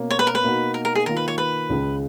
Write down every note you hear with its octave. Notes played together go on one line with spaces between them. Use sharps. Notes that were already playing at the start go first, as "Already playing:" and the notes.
Already playing: B2 A#3 C#4
C#5
B4
A#4
B4
B2 A#3 D#4 F#4
A#4
A#4
G#4
D#3 A#3 F4 A#4
B4
C#5
B4
C#2 C#3 G#3